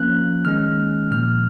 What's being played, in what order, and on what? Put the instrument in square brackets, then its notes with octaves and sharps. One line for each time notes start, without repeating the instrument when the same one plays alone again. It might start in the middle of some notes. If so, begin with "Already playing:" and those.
Already playing: [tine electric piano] F3 A#3 C#4 F#6
D#3 G#3 C#4 F6
A#2 F3 A#3 F6